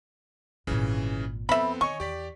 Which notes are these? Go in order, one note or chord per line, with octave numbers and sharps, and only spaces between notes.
G#1 A#2 C#3 E3 C#4
F2 B3 C4 A4 E5 B5
D#3 C#5 D#5 G#5 C#6
E2 G4 D5 B6